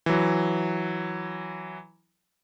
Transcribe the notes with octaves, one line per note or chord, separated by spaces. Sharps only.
E3 F#3